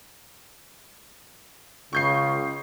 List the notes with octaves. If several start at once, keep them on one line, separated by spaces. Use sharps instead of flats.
C#2 C#3 C#6 G6 C7